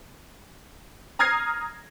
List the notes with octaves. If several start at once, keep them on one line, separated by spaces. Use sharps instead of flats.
A#5 D#6 F6 G#6 A#6 C7